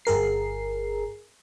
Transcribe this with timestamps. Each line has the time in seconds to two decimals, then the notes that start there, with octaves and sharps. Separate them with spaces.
0.05 G1 G#4 A#4 C7